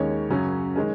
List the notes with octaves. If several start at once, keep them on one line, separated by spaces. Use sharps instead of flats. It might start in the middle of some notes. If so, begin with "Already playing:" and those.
Already playing: D#2 D#3 G#3 C#4 C#5
F#2 C#3 F#3 C#4
D#3 G#3 C#4